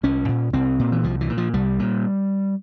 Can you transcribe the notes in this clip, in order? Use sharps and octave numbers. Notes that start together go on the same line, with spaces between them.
C2 C#4
A#2
C2 C4
A#2
E3
C2 F3
E3
A#2
F3
C2 G3
A#2